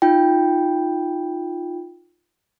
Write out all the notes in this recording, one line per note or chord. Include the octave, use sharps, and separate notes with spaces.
D#4 F4 G5